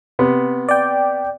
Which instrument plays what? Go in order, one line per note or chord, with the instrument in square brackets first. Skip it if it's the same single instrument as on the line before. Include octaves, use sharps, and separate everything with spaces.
[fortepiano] C3 B3
[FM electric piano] D5 G5